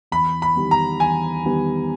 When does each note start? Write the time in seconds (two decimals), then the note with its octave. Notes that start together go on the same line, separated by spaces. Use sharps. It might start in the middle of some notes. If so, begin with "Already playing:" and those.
0.12 E2 B5
0.42 B5
0.56 D#3 G3 B3
0.71 A#5
1.00 E2 G#5
1.44 D#3 G3 B3